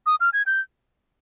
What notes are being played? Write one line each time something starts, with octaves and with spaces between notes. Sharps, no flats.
D#6
F6
G#6
G6